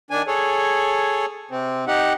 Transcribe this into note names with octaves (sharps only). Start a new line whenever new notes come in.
D#3 D4 G#5
G#4 A4 C#5
C3 C4
D#4 G4 F#5